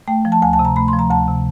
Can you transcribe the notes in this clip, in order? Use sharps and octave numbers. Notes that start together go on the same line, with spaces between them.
A3 G5
F3
A5
D2 G#5
A5
C3
A#5
A3 B5
C6
F3
A#5
D2 A5
C3